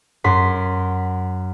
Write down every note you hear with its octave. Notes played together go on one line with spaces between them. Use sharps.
F#2 C6 B6